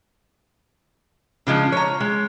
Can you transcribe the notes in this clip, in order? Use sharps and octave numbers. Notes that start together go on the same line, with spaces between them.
C#3 F3 G#3 D4
C#5 A#5
G#3